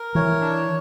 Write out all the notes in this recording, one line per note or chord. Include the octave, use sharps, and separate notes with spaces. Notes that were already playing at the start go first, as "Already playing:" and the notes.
Already playing: A#4
E3 C#5
D4